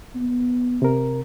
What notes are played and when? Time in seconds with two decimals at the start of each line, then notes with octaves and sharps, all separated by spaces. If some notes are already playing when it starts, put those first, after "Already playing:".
0.15 B3
0.82 C3 A#4